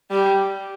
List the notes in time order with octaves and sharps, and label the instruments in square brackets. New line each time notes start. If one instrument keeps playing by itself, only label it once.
[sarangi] G3